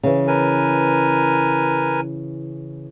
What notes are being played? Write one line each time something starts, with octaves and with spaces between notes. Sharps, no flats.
C#3 E3
A#4 B4 G#5